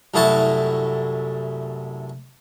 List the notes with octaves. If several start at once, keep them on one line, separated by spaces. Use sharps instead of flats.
C2 F#2 A3 E4 F#4 A5